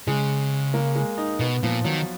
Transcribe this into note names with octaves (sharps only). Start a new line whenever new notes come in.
C#3 G#3
A#3
G#3
D#4
B2 B3
A#2 F3
D#3 F#3